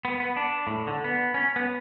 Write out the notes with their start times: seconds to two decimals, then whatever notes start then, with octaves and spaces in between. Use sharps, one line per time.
0.05 B3
0.20 B3
0.37 D4
0.67 A2
0.87 D3
1.04 B3
1.34 C#4
1.56 B3